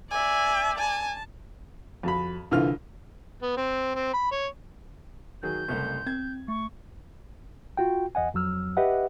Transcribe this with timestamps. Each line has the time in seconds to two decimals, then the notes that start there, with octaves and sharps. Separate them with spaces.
0.11 D5 E5 G#5
0.79 G#5 A5
2.03 F2 F#4 B5
2.51 C2 D3 E3 F4 F6
3.42 B3
3.57 C4
3.95 C4
4.13 B5
4.31 C#5
5.43 D#3 F#3 G#4 G6
5.68 F#1 C2 A3 C6
6.07 C4 G#6
6.48 A3 C#6
7.77 F4 F#4 G5
8.15 E2 D#5 F#5 G#5
8.34 F2 F#3 E6 F6
8.77 G4 B4 D#5 E5 F#5